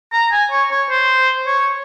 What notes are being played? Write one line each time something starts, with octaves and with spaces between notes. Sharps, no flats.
A#5
G#5
C#5
C#5
C5
C#5